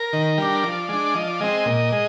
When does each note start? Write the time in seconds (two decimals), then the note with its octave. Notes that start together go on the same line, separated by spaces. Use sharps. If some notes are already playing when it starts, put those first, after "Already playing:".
Already playing: A#4
0.13 D#3
0.38 G3 D4
0.63 F3 D5
0.89 G#3 D4
1.14 F3 D#5
1.27 D5
1.40 G#3 C4 D#5
1.66 A#2
1.92 G#3